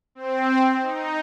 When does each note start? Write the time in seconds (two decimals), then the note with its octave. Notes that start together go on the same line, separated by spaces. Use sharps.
0.15 C4
0.81 D#4